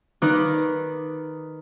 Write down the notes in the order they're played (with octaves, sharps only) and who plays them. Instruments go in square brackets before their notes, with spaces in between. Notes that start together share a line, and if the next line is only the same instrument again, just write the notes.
[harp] D#3 D#4 B4 D5